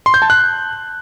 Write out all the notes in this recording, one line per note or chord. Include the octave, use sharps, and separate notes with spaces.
C6
G6
A5
F#6